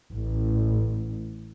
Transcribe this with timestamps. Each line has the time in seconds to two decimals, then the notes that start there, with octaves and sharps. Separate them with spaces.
0.13 A1